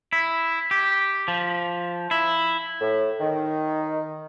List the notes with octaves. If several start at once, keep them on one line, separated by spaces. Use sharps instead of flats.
E4
G4
F3
E4
A2
D#3